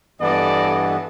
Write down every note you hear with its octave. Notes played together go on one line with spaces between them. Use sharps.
G2 E3 B3 A4 D5 D#5